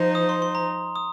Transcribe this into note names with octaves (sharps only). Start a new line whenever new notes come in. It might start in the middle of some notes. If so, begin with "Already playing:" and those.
Already playing: F3 D#4 C5
D#6
C6
C6
A#5
D#6